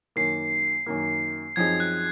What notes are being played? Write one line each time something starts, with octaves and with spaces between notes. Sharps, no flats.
F#2 D#3 A#3 C7
F#2 D#3 A#3
F#2 F3 C4 D#4 G#4 G#6
F#6